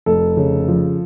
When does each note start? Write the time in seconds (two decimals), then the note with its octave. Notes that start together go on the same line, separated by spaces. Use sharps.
0.06 F1 A4
0.37 C#3
0.68 F3